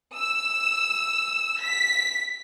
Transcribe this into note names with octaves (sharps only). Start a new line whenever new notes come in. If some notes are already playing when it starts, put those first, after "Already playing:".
E6
B6